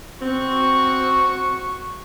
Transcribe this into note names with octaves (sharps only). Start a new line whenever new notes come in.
C4 F#4 C#6